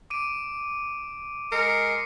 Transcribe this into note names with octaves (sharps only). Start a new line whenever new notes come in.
D6 D7 D#7
G#3 G#4 A#4 C7 C#7